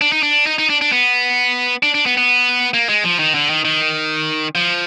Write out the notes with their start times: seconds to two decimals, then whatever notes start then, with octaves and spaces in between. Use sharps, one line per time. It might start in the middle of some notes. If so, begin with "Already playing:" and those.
0.01 D4
0.12 D#4
0.23 D4
0.46 D#4
0.58 D#4
0.70 D4
0.81 D4
0.92 B3
1.83 D4
1.94 D4
2.06 B3
2.17 B3
2.74 A#3
2.89 G#3
3.04 F3
3.19 D#3
3.34 D3
3.50 D#3
3.65 D#3
4.55 F3